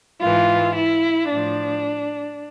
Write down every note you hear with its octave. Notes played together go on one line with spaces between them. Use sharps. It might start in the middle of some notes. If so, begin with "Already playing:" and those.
G#2 E3 F4
E4
A2 F3 D4